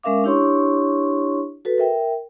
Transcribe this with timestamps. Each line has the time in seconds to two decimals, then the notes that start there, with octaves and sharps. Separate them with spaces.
0.03 G#3 C#4 A#4 E5 F5 D6
0.24 D4 E4 G4 C#5 C6 C#6
1.65 F#4 A4 B4
1.78 A#4 E5 G5